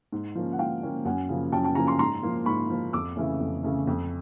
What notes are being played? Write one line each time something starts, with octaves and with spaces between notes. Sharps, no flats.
G#2
F3 A#3 C#4
F#5
G#2 F5 G5
F3 A#3 C#4
F#2 F#5 G#5
C#3 F3 A#3
F#2 G5 A5
G5 A5
C#3 F3 A#3 G#5 A#5
A#5 C6
G#2 A#5 C6
F3 A#3
G#2 B5 C#6
F3 A#3
F2 D6 E6
C#3 E3 A3 C#4
F2
C#3 E3 A3 C#4
F2